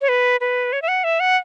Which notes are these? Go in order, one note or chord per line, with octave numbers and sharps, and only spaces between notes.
C#5
B4
B4
C#5
E5
F#5
E5
F#5